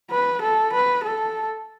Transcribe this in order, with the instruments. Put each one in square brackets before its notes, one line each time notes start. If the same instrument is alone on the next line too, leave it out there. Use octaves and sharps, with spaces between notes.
[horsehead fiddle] B4
A4
B4
A4